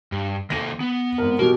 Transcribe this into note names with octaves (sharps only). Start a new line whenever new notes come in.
G2
D#3 A#3 A4 A#6 D#7
B3
G#1 A#4
B2 F#3 G4 A#4